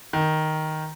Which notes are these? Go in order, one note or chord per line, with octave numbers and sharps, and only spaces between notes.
D#3